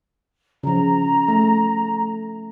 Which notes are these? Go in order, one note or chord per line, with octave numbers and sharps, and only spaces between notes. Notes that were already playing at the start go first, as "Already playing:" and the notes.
C#3 F3 A#5
A3